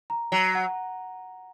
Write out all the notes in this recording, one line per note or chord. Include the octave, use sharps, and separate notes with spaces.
A#5
F#3 A#5
F#5